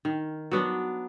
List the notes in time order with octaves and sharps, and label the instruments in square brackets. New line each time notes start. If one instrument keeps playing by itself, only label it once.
[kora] D#3
F#3 B3 D4